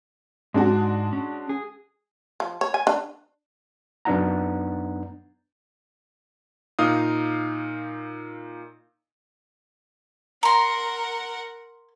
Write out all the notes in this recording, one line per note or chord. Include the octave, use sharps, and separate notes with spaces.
G#2 G#3 D4 F#4
C#4
G#4
F3
C#5
G#5
D4
F#2 B3 D4 D#4 F#5 A#5
A#2 D#4 F5 D#6
A#4 F#5 A#5 C6